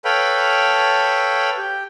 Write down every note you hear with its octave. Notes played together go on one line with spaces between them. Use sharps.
A4 B4 C#5 F5 G5 B5
G4